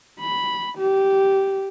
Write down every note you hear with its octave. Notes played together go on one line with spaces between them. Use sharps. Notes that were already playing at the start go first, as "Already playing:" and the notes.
B5
G4